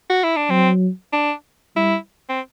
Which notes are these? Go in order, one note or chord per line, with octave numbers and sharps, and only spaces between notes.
F#4
E4
D4
F#3 C4
D4
G3 E4
C4